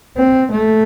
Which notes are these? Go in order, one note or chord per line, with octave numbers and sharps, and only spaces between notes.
C4
A3